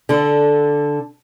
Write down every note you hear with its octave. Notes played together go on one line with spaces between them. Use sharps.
D3 A4